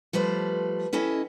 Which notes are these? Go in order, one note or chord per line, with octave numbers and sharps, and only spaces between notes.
F3 G3 A3 B4 C5
C#4 E4 A4 D#5 G5